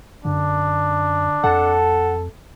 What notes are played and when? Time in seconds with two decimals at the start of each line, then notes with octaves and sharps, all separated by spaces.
0.25 F#2 D3 D4
1.44 F2 A4 F#5 A5